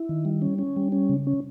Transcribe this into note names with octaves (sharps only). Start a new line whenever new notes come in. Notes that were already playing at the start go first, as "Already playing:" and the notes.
Already playing: E4
D#3
G3
C#4
C#4
G3
C#4
C#3
C#4